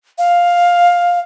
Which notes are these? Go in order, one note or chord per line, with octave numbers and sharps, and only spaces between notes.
F5